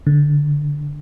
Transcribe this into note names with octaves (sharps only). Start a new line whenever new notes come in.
D3